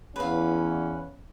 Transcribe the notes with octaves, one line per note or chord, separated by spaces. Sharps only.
E2 C#4 B4 F5